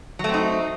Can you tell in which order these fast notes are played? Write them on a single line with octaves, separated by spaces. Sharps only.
F#3 A3 C4 D#4